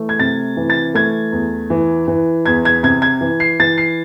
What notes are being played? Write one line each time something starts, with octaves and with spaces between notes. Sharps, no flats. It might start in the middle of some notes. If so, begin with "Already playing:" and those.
Already playing: E3 A3
G#6
C3 A6
E3
A6
A3 G#6
E2
E3
E3
E2 G#6
G#6
C3 G#6
G#6
E3
C7
E3 A6
C7